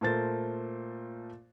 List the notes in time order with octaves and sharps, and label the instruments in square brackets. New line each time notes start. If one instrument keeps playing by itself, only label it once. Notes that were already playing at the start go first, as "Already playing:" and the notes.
[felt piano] A#2 A3 A4 A#4 C5 A6